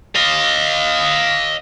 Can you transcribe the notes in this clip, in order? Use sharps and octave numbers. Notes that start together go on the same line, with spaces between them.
D#5 F5